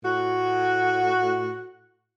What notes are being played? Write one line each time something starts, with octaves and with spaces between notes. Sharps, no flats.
A2 F#4